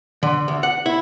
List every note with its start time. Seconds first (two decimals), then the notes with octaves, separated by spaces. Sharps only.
0.23 D3
0.48 D2
0.63 F#5
0.86 E4